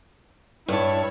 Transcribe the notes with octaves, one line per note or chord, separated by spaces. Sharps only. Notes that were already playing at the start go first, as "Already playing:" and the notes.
G2 E4 C#5 A5